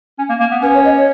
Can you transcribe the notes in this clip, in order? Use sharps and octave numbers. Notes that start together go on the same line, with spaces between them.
C#4
A#3
A#3
B3
C#4 B4
C#5
D#5
C#5